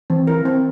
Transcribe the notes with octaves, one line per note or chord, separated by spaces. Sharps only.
E3 C4
E4 A#4
C4